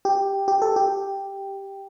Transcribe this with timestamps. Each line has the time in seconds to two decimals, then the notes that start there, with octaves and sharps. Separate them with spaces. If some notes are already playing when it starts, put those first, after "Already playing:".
0.05 G4
0.48 G4
0.62 A4
0.76 G4